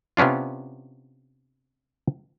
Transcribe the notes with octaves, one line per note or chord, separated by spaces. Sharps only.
C3 B3 C#4 D4 F4